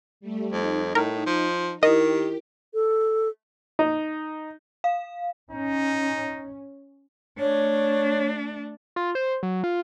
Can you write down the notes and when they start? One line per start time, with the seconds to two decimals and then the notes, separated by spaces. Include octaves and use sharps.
0.21 G3 A3
0.53 F2 D#4
0.95 A2 A#4
1.26 F3
1.83 D#3 E4 G4 A#4 D#5
2.74 A4
3.79 D#4
4.84 F5
5.51 C#4 D#4
7.40 A3 D4 C#5
8.96 F4
9.15 C5
9.43 F#3
9.64 F4